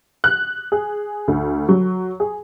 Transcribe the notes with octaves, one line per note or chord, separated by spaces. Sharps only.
F#6
G#4
D2
F#3
G#4